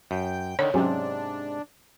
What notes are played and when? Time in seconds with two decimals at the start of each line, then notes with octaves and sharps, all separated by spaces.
0.11 F#2 G5
0.59 D3 D#3 C#5
0.74 G#2 C3 F#3 C#4 D4 G4